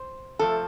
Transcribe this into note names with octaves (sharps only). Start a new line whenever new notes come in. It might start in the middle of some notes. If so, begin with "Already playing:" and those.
Already playing: C5
C3 F3 A3 A4